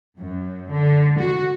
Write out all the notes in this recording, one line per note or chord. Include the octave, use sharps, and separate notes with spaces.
F#2
D3
F#4